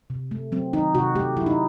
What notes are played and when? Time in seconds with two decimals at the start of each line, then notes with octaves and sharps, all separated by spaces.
0.10 C3
0.31 A3
0.52 F#3 C4
0.73 D#3 D#4
0.95 C3 F#4
1.15 A3 G4
1.37 F#3 E4
1.46 D#4